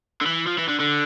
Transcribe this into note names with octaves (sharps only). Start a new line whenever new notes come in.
D3
E3
F3
E3
D3
D3